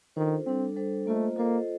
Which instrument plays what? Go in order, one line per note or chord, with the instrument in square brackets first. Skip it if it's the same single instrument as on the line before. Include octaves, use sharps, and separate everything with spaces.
[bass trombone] D#3 [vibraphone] D4 F4 A4 C5
[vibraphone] G3 D4 A4 [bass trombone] C4
[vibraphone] G3 D4 A4 C5
[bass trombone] A3 [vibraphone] A#3 F4 C5 D#5
[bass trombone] A#3 [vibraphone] F4 A4 C5 D#5